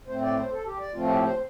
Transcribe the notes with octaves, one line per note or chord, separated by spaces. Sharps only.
A2 A3 C4 C5
D5
C5
A4
G4
D5
A2 F3 A3 C4 F4
G4
C5